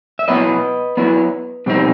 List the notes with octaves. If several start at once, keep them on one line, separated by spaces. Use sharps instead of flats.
E5
F#3 B3 E4 B4 D#5
F#3 B3 E4
B2 G3 C4 D#4